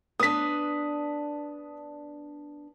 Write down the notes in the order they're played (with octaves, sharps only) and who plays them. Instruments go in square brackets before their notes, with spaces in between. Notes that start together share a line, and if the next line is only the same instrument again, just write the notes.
[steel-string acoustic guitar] B3 D4 [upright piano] D#6 B6